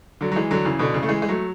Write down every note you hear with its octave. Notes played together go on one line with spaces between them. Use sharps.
D3 F#3
F#3
E3 G#3
D3 F#3
C#3 E3
B2 D3
C#3 E3
A3
E3 G#3
G#3
F#3 A3